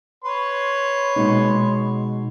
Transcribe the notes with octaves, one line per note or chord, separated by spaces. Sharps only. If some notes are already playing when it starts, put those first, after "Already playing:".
B4 C#5 C6
B2 G#3 D#4